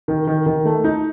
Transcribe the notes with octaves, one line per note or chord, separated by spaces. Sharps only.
D#3
D#3
D#3
A3
D#4